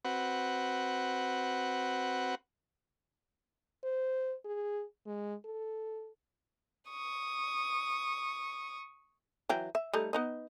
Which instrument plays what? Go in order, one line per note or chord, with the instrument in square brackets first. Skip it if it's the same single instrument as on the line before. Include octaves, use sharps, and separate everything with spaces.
[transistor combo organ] C4 F#4 B4 F#5
[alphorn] C5
G#4
G#3
A4
[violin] C#6 D#6
[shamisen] E3 F#3 G5
E5
G3 A3 D#4
B3 D#4 D#5